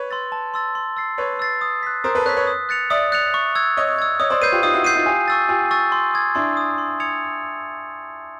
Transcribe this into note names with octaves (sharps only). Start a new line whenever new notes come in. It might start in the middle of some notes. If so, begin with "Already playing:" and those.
Already playing: B4 C#5
C6 E6 A6
A5
C6 E6 A6
C6
E6 A6 C7
B4 C#5 C6
E6 A6 C7
D#6
F#6 B6
A#4 C5 D#6
A4 B4
B4 C#5 F#6 B6
B4 C#5
D#6
F#6 A6 C#7 F7
D5 E5 D#6
F#6 A6 C#7 F7
C#6
E6 G#6
C#5 D#5 C#6
E6 G#6
C#5 D#5 D#6
C5 D5
B4 C#5 G6 C7 D#7
F4 G4
D#4 F4 D#6
E4 F#4
E4 F#4 G6 C7 D#7
D#4 F4
F4 G4 G#5
C#6 E6 A6
F4 G4 G#5
C#6 E6 A6
C6
D#6 G#6
D4 E4 C6
D#6 G#6
C6
D#6 G#6 C#7 F7